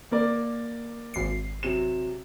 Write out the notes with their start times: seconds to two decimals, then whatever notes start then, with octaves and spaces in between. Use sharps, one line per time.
0.11 A#3 A#4 D5
1.14 G#1 C7
1.63 C3 F#3 E7